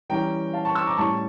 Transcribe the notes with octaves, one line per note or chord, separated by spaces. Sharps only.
E3 G3 C#4 G5 A#5
F5 A5
A5 C#6
C#6 E6
A#5 D6
A2 G3 C#4 A5 C#6